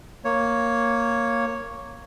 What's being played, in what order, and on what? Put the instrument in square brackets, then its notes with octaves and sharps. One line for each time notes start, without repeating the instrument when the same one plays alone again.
[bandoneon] A#3 C#5